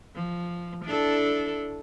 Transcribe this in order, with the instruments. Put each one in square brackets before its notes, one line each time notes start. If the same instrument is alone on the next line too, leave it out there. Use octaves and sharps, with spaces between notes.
[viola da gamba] F3
D4 E4 A4